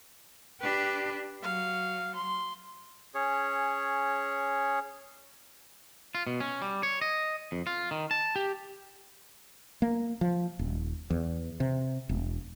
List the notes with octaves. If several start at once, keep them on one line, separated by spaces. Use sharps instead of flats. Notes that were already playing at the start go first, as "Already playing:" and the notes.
D4 G4 B4
F#3 F5
C6
C#4 G#4 C#5
F4
B2
C#4
G3
C#5
D#5
F2
F4
D#3
A5
G4
A#3
F3
D#1
E2
C3
E1